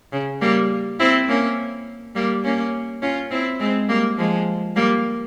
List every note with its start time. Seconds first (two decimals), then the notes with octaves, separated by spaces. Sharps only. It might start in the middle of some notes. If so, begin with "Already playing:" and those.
0.13 C#3
0.41 G3 A#3
0.99 C4 E4
1.29 A#3 C#4
2.15 G3 A#3
2.44 A#3 C#4
3.02 C#4 F4
3.31 C4 E4
3.60 G#3 C4
3.89 G3 A#3
4.18 F3 G#3
4.76 G3 A#3